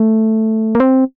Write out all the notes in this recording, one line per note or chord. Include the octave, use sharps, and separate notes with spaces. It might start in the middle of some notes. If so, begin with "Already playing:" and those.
Already playing: A3
A#3
C4